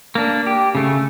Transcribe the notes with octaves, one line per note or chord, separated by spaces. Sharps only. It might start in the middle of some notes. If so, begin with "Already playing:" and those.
A#3 D4
G4
C#3 A3